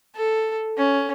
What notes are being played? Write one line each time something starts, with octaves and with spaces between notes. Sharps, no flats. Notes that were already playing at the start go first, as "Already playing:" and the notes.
A4
C#4